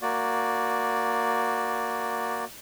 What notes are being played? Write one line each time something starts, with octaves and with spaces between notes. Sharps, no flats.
A#3 F#4 D5